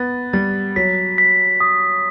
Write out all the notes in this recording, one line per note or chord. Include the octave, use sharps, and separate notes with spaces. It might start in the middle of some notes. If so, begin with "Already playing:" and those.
Already playing: B3 A6
G3 A6
F#3 B6
B6
D#6